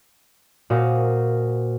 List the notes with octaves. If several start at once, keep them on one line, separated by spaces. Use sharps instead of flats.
A#2 F#4 C5 D#5 F5 C#6